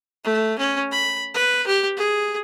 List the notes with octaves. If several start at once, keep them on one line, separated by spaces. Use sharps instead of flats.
A3
C#4
B5
B4
G4
G#4